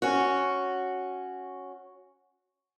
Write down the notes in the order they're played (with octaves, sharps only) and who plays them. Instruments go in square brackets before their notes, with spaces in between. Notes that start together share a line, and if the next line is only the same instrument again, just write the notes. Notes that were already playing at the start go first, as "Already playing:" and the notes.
[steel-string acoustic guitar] C#4 F#4